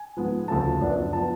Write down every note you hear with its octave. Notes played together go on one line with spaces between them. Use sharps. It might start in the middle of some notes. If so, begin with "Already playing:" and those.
Already playing: G#5
G#2 F3 G#3 B3
D2 C#3 F3 A3 A5
F#2 F3 B3 D4
F3 B3 A5